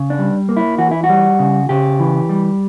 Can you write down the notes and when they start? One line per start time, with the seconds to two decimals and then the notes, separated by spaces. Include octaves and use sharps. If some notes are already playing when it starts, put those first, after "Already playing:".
Already playing: C#3
0.10 D4
0.19 G3
0.49 A#3
0.57 E4
0.78 E3 F#4
0.91 E4
1.04 F#4
1.09 G3
1.39 C#3
1.69 C#3 G4
2.00 E3
2.29 G3